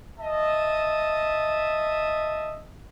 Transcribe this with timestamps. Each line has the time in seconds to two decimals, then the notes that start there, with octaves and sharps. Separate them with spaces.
0.19 D#5 E5 A5